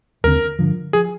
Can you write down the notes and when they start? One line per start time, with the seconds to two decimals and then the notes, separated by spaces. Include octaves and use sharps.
0.24 D#2 D3 G#3 C4 A#4
0.59 G2 D3 F3
0.93 F3 G#4